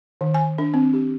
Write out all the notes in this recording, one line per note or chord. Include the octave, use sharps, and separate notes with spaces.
D#3
G#5
D4
C4
G4